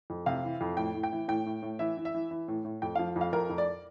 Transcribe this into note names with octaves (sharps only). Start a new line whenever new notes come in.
F2
C3 F5
E3
F2
A2 G5
A2
G5
E3
A2 G5
A2
A2
E3 E5
E3
E5
E3
E3
A2
A2
F2 G5
F3 F5
F2
F5
F2 A#4
F2
D5